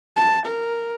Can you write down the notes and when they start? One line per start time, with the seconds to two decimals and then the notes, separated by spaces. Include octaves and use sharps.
0.16 A5
0.45 A#4